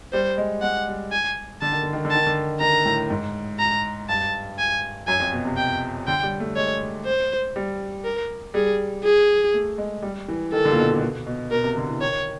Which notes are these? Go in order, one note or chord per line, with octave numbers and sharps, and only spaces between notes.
G3 C5
G#3
G#3 F#5
G3
G#5
D3 A5
D#3
D3
D#3
D3
D#3 A5
D3
D#3 A#5
A2
G#2
A#5
G2 A5
G#5
F#2 G#5
F2
B2
C3
G5
D3 G5
G3
A3
G#3 C#5
C5
G3
A#4
G3 G#4
G#4
A3
G#3
G3
E3
D#3 A4
D3
A#2
B2
A#2
B2
B2
B2 A#4
C3
D3
E3
D#3 C#5